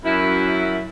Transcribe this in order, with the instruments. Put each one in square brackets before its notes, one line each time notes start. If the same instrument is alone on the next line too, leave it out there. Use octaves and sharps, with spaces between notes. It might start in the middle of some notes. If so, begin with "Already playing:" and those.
[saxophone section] F#2 E4